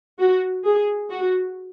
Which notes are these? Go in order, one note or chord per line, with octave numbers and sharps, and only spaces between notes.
F#4
G#4
F#4